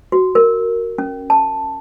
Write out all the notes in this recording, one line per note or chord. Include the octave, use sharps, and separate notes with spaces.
F#4
A#4
C#4
A5